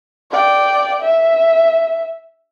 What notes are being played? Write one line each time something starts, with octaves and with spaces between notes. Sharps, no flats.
D5 G5
E5